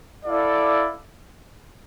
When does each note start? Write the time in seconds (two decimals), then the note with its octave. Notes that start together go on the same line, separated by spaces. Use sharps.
0.24 E4 A4 D5 F5